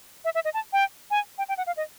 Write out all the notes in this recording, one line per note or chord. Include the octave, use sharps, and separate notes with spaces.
E5
E5
D#5
A5
G5
G#5
G5
G5
F#5
F5
D#5